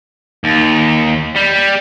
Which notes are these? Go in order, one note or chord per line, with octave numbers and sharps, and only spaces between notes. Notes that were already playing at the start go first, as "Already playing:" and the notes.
D#2
G3